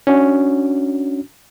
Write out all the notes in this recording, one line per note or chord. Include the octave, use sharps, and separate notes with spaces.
C#4 D4 F#4